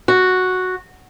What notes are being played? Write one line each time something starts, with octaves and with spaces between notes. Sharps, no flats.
F#4